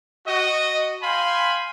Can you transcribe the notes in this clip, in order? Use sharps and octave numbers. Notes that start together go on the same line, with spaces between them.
F#4 D#5
F5 G5 G#5 B5 C6